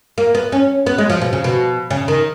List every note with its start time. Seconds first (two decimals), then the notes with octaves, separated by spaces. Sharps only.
0.18 A#3
0.35 B3
0.52 C#4
0.86 B3
0.98 G#3
1.10 F3
1.21 B2
1.33 C#3
1.44 B2
1.91 C#3
2.08 D#3